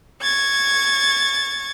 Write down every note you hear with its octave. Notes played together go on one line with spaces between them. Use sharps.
C#6 G#6 A6